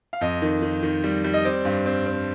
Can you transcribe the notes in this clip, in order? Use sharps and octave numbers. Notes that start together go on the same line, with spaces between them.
F5
F2 D#5
D#3
D#3
D#3
G3
G3
D#5
C4 D5
G2
C4
C4